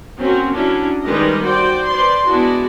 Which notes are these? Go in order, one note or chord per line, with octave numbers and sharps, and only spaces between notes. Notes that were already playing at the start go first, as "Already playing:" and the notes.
F#3 A#3 C4 C#4 F#4
F#3 C#4 D4 E4
D#3 G3 G#3 A#4 B4 D#5
F#4 C5 D5 G5
B4 C5 D5 C6
G#3 B3 D4 E4 F#4